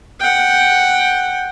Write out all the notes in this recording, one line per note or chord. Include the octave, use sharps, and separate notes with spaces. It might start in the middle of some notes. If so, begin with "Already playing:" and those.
F#5 G5